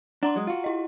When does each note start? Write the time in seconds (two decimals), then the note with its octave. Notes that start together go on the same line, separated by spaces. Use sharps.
0.23 D4 F#5 A#5 C6
0.35 F#3 G#3
0.47 F4 F#4
0.64 E4 D#5